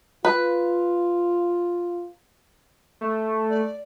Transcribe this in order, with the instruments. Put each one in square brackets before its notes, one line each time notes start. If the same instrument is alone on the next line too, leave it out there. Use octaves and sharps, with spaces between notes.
[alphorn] F4 [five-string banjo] B4
[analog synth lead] A3
[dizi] D5